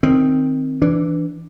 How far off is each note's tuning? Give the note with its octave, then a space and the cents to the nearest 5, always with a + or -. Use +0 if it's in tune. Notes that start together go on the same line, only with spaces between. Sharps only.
D#3 +0 C4 +0
E3 +10 D4 +0